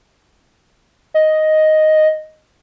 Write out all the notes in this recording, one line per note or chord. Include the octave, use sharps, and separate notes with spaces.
D#5